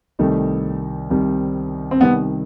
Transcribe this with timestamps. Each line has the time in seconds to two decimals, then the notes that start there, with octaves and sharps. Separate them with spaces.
0.19 C2 C3 D#3 G3 A3 D#4
1.10 C2 C3 D#3 G3 D#4
1.91 C4
2.01 C2 C3 D#3 G3 B3 D#4